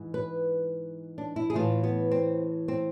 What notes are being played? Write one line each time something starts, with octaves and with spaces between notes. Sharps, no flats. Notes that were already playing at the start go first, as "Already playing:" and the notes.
Already playing: G#2 E3
B4
D4
E4
G#4
A2 E3 A3 F4
B3
C4
C4